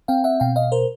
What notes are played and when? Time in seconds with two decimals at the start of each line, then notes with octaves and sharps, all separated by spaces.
0.08 C4 F5 G5
0.24 E5 F#5
0.40 B2 F5 G5
0.56 D#5 F5
0.72 A#4 C5